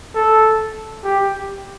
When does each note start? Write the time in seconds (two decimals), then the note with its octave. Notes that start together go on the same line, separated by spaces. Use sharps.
0.15 A4
1.04 G4